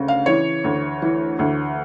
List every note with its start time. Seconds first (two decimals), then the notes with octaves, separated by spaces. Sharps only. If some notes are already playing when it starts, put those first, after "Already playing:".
Already playing: D2 C#3
0.08 F5
0.26 E3 C#5
0.64 D2
1.02 E3
1.39 D2